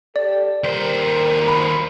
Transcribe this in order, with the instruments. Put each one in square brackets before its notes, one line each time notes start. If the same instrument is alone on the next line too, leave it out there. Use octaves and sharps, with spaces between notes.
[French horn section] G4 A4 [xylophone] D5
[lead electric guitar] D#2 C5 [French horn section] G3 A#4
[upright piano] B5